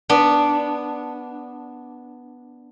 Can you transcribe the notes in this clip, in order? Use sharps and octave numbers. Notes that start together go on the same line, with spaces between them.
B3 D4